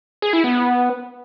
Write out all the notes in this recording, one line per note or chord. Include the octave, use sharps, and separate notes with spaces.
G#4
E4
B3